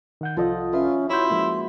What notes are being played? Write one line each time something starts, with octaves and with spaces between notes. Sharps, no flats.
D#3 F#5 G6
C2 F3 F4 A4 D#5 F#5
C#4 F4 B4 E5
E4 F#4 C#5 C6 G6
F3 G#3 A#3